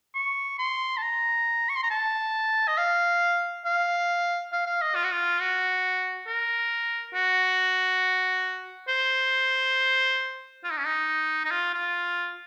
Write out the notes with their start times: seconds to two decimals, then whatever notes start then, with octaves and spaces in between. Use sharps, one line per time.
0.15 C#6
0.59 C6
0.97 A5
1.02 A#5
1.69 C#6
1.76 C6
1.83 A#5
1.90 A5
2.68 D#5
2.78 F5
3.65 F5
4.53 F5
4.66 F5
4.82 D#5
4.95 F4
5.04 F#4
5.12 F4
5.39 F#4
6.27 A#4
7.14 F#4
8.88 C5
10.64 F4
10.71 D#4
10.78 C#4
10.85 D#4
11.45 D#4
11.51 F4
11.74 F4